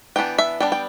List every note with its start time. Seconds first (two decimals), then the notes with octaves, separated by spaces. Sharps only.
0.16 E3 B3 D4 G5
0.38 E5
0.60 G3 B3 D4 G5
0.72 G5